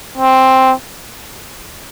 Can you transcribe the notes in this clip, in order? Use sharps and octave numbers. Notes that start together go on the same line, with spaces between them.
C4